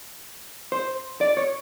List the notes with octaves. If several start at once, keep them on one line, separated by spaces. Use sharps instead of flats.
C5
D5
C#5